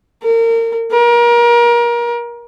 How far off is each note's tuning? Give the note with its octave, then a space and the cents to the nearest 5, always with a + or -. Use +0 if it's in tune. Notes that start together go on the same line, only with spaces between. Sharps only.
A#4 -30
A#4 +30